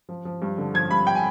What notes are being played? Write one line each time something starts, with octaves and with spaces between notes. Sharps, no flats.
F3
F3
G2
D3
F3 G#6
G2 B5
G5
G#5